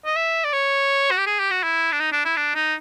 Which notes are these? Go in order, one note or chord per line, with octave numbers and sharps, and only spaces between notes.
D#5
E5
D5
C#5
F#4
G4
G#4
G4
F#4
E4
D4
D#4
D4
E4
D4
D#4